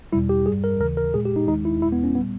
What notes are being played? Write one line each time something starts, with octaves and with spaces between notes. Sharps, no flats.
E2 B2 G3 E4
G4
G2 G3 G#4
A#4
D#2 C#3 E3 A#4
A#4
A#2 G#3 G#4
G4
D#4
D#2 D#3 G#3 D#4
E4
E2 B2 G#3 E4
B3
C#4
A#2 G3 B3